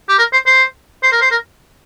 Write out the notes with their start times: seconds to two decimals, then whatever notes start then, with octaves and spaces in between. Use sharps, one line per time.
0.09 G4
0.18 A#4
0.32 C5
0.46 C5
1.03 C5
1.12 A#4
1.21 C5
1.31 A#4